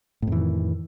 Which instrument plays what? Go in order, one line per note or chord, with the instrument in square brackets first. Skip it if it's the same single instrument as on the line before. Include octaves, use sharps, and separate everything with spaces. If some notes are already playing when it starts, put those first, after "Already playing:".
[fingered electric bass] A2
F2
E3
D#3